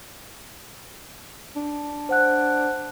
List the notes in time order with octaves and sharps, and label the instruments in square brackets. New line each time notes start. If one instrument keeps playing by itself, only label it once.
[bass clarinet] D4
[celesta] C5 F#5 F#6